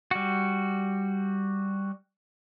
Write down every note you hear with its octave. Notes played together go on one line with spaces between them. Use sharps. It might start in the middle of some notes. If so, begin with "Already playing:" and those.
G3 F#4